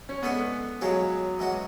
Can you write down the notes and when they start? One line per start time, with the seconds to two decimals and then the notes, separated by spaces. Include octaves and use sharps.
0.09 C#4
0.23 G#3 B3 D4 A4 D5
0.81 C#3 F#3 G#3 C#4 G#4 C#5
1.39 E3 G#3 C#4 F#4